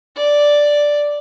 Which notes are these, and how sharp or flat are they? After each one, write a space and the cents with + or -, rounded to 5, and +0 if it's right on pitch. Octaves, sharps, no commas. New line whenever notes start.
D5 +0